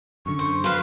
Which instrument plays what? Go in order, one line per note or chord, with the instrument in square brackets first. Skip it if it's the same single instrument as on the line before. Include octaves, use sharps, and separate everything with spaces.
[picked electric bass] F#2 D3 [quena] C#6
[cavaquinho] C5
[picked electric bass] F#3 [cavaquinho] B4 C5 [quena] F5